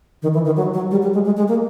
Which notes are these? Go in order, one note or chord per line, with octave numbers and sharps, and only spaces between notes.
D#3
E3
D#3
F#3
F#3
G3
G3
G#3
G#3
G#3
A#3